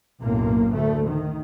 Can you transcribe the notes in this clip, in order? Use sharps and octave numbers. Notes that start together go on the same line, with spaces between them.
B1 F#2 A2 A#3
D2 A3
D#3